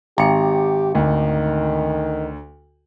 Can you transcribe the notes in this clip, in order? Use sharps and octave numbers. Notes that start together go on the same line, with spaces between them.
G#1 G4 A#5 C#7
D2 D#3